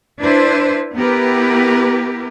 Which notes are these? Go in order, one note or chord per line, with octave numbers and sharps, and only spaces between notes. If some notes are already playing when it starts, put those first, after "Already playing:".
D4 E4 B4 C5
B3 E4 G4 A#4 B4